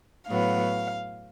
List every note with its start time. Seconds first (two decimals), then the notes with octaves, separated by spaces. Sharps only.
0.29 A2 F#3 B3 F5